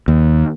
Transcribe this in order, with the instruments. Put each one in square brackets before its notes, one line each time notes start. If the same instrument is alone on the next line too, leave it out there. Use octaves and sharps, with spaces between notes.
[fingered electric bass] D#2